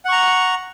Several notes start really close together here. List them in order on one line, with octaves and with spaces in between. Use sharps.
F#5 C#6 A#5